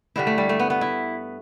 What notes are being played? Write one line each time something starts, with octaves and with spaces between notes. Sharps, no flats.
G2 D3 G3 E4
A3
G3
A3
B3
B3
E4